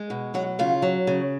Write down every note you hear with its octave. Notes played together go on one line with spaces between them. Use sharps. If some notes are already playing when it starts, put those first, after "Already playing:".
Already playing: G#3
B2
F#3 F#4
C#3 F4
F#3
C#3